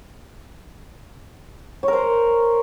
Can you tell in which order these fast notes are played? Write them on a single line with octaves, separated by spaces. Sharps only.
C#5 A#4 C5